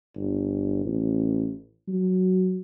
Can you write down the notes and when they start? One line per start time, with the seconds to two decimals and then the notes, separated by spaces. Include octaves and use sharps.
0.16 G1
0.85 A1
1.88 F#3